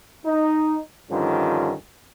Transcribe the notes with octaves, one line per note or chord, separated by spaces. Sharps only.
D#4
G2 D3 D#3 F3 C#4 F4